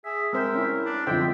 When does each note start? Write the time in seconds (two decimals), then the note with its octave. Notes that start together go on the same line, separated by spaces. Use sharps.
0.05 G#4 E5
0.33 G#3 C4 A#4 C5 E5
0.55 C#4 E4
0.86 D4
1.07 F2 D3 G#3 A4 C5 E5 G5